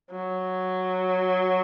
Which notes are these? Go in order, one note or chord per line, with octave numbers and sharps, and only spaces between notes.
F#3